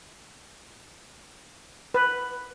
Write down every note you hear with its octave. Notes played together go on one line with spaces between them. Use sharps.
B4